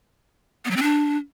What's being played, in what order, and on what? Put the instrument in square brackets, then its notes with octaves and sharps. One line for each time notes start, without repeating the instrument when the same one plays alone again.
[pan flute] B3
F#3
C4
D4